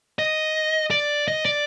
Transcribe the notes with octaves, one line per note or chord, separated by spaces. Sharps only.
D#5
D5
D#5
D5